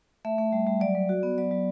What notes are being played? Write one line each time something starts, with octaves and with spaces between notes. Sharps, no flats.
A3 E5
A3
G3
G3
F#3 D5
F#3
F#4
B3
F#3 D5
F#3